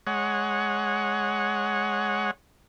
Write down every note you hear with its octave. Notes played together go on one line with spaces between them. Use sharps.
G#3 C#5 F#5